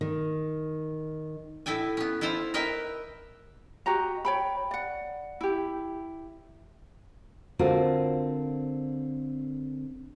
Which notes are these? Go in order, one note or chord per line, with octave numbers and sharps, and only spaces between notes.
D#3
A2 E4 A4 G5 G#5
B3 C#4
E4 F4 A4 C5 F5
A#4 B4 D#5 E5 G5
F#4 G4 D#5 A#5
C#5 G5 B5
D5 F#5
E4 G4
D3 C4 F4 F#4 A#4